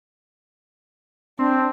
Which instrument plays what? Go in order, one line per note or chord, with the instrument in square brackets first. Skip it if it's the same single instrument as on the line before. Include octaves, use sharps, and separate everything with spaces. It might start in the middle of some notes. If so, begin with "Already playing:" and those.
[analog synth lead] C4 [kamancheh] D4